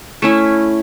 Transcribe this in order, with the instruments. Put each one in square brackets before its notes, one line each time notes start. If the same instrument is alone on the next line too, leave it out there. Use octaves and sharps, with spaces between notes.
[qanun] A3 C#4 E4